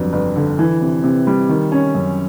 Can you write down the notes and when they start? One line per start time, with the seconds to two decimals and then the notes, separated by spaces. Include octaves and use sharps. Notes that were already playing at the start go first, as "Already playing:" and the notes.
Already playing: G1 F2 F#3
0.13 G1
0.36 D3
0.59 E3
0.82 C3
1.04 C3
1.27 G3
1.49 D#3
1.72 C#4
1.95 F#2